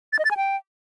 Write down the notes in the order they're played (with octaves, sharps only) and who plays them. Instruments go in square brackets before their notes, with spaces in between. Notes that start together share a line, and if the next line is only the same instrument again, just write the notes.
[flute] A6
D#5
A6
G#5
G5